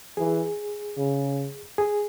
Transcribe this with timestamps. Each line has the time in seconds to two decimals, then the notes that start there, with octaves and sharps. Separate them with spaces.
0.17 E3 G#4
0.97 C#3
1.78 G#4